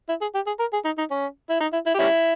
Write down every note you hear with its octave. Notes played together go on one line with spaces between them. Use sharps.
E4
G#4
G4
G#4
A#4
G#4
D#4
D#4
C#4
E4
D#4
E4
E4
G4
G3 C#4 E4